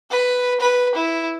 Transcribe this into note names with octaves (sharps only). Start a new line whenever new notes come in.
B4
B4
E4